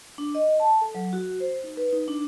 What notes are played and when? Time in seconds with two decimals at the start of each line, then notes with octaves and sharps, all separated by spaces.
0.18 D4
0.35 D#5
0.60 A5
0.81 A4
0.95 F#3
1.13 F#4
1.40 C5
1.64 D#4
1.77 B4
1.93 D#4
2.08 D4